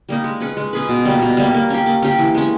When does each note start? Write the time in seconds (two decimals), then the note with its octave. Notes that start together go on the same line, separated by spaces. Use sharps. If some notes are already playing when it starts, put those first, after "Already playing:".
0.09 G3 A#3 D#4
0.24 G#3
0.40 C#4 G#4 B4
0.57 G#3
0.73 C#4 G#4 B4
0.89 B2
1.05 G3 A#3
1.22 B2
1.37 G3 A#3
1.54 A#3
1.70 C#4 G4
1.86 A#3
2.02 C#4 G4
2.19 E3
2.35 G#3 C#4